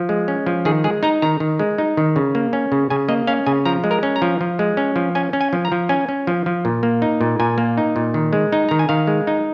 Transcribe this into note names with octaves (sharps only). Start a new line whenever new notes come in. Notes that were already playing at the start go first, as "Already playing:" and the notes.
Already playing: F3
G#3
C#4
F3
D#3 G#4
G#3 G#4
D#4 A#5
D#3 A#5
D#3
G#3
D#4
D#3
C#3
A#3
C#4
C#3
C#3 G#5
A#3 D#5
C#4 F5
C#3 G#5
F3 A#5
G#3
A#4
C#4
A#5
F3
F3
G#3
C#4
F3
C#4 G#5
C#4
G#5
F3
A#5
F3
C#4 G#5
C#4
F3
F3
A#2
A#3
D#4
A#2
A#2 G#5
A#3
D#4
A#2
D#3
G#3
D#4
D#3 A#5
G#5
D#3 F5
G#3
D#4